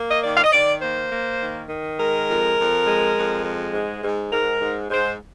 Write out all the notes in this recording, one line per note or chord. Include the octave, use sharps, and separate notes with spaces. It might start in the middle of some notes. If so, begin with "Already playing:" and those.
Already playing: A#3
D#5
D#3 D5
F5
D#5
D#3 D5
A#3 C5
A#3
D#3
D#3
G#3 A#4
F2
F2
G#3
F2
G#3
G#2
G#2
G#2 A#4
G#2
G#2 C5